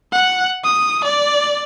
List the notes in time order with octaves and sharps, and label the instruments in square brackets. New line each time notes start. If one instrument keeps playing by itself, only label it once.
[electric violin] F#5
D#6
D5